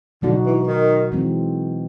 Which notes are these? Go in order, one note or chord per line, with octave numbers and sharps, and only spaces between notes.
B2 D3 F#3 B3 D#4 F#4
E3
D#3
E3 G#3 C4